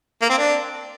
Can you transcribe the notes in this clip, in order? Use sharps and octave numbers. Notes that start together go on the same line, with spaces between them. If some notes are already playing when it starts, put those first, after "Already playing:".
A#3
C4
D4